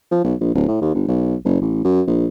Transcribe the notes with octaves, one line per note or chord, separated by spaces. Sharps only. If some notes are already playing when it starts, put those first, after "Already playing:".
F3
B1
A#1
D1
A2
D#2
G1
B1
F#1
A1
F#2
A#1